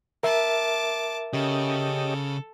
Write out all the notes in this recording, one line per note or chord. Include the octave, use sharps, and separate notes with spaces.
A#4 E5 A5 D6
C#3 C#4 G4 A4 D#5